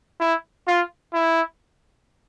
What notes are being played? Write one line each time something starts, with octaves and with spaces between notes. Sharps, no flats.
E4
F4
E4